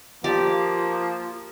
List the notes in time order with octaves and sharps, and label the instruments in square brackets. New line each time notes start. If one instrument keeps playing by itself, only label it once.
[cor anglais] F3 [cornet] A#3 [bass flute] F4 [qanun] G4 D5